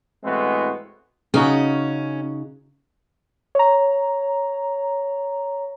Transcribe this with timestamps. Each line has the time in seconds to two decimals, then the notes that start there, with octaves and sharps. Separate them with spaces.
0.24 A2 E3 G#3 B3 C4 F#4
1.34 C#3 C#4 D#4 F#4
3.55 C#5 A#5